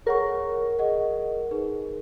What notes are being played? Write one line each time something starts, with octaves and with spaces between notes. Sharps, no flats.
G#4 A#4 C#5 F#5 C#6
G#4 D#5 F#5
D#4 G#4 B4